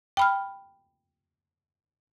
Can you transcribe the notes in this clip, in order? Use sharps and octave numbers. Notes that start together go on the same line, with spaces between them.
G5 B5 F6